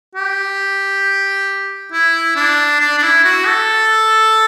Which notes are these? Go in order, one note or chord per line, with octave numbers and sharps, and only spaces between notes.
G4
E4
D4
D4
D4
E4
F#4
A4